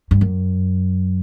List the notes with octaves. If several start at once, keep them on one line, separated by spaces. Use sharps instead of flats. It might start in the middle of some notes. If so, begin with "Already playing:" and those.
G2
F#2